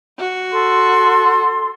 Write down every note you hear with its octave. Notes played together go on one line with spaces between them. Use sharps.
F#4
A4 C6